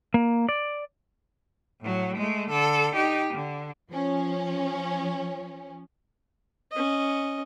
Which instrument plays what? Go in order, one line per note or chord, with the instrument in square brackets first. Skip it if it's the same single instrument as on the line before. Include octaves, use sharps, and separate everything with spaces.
[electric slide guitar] A#3
D5
[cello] A2 F#3
G#3 A3
D3 A4
D#4 G4
D3
[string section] F3 C#4
[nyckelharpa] C#4 D#5